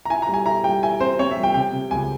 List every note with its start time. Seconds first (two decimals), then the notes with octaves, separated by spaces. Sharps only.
0.05 A#5
0.10 E4 G#5
0.22 A#5
0.29 G3
0.34 G#5
0.46 E4 A#5
0.64 G3 G5
0.83 E4 G#5
1.00 C4 C5
1.19 C4 C#5
1.31 E5
1.36 G3
1.43 G5
1.54 C3 G5
1.73 C3
1.91 C#2 G#5